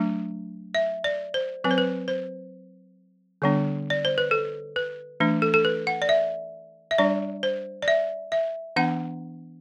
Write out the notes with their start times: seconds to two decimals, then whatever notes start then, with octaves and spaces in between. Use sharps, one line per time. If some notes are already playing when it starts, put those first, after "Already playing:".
Already playing: F#3 A3 D4
0.75 E5
1.04 D5
1.34 C5
1.64 F#3 C4 B4
1.71 C5
1.78 B4
2.08 C5
3.42 D3 G3 B3 D4
3.90 D5
4.05 C5
4.18 B4
4.31 A4
4.76 B4
5.20 E3 A3 D4
5.42 A4
5.54 A4
5.65 B4
5.87 F#5
6.02 D5
6.09 E5
6.91 E5
6.98 G3 D4 D5
7.43 C5
7.82 D5
7.88 E5
8.32 E5
8.76 E3 B3 D4 F#5